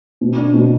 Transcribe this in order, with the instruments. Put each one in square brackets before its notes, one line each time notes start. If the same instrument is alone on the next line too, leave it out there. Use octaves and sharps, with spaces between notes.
[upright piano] B2
D4
B2